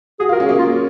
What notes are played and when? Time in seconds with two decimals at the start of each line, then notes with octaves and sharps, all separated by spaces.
0.20 F#4 G#4
0.29 F4
0.33 A#4
0.40 C#4
0.46 G#4
0.49 A#3
0.59 F4